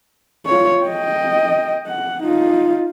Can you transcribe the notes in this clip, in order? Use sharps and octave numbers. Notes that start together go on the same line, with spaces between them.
F4 C#5
D#5 G5
F#5
D#4 F4